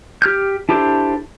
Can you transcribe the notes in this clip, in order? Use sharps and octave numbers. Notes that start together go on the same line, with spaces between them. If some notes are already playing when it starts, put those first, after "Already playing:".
G4 F6 G6
D4 E4 G4 A4 C5